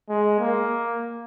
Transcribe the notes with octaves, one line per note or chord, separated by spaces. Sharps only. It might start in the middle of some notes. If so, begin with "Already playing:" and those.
G#3
A#3